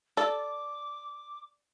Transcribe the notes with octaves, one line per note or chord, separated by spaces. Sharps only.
A4 D5 D6